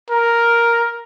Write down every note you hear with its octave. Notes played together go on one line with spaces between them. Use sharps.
A#4